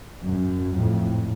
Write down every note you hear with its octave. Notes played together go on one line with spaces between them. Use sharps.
F#2
F2 A2